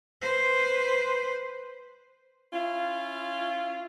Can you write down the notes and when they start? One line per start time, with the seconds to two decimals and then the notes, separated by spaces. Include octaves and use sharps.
0.21 B4 C5
2.53 C#4 E4 F4